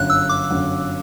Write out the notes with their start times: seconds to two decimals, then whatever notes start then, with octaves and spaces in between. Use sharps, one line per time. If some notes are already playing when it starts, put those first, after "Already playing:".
Already playing: G1 F#2 D3 F#3 F#6
0.10 E6
0.29 D6
0.50 G1 F#2 D3 F#3